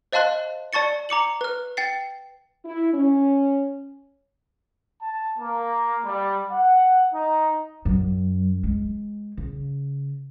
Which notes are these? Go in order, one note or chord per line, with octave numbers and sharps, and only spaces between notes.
C5 D#5 F5 A5 C6 F#6
D5 A5 C#6 A6 C#7
A#5 D6 C#7 F#7
B4 F6
G5 A6 C7
E4
C#4
A5
A#3
G3
F#5
D#4
F#2
G#3
C#3